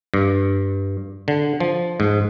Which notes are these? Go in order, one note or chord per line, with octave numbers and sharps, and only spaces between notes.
G2
D3
F3
G#2